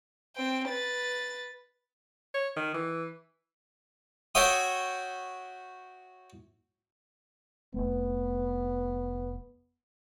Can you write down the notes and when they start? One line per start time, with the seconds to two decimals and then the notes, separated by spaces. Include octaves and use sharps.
0.36 C4 G5
0.69 B4 A6
2.34 C#5
2.57 D#3
2.74 E3
4.35 F#4 C#5 E5 G5 D#6
7.74 F1 C#2 A3 B3